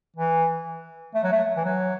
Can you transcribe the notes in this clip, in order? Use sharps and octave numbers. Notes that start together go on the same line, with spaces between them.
E3
A3
F#3
A3
E3
F#3